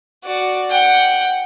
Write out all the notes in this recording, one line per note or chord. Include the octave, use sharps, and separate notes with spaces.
F#4 D5
F#5 G5